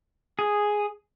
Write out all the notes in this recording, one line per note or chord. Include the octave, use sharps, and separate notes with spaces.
G#4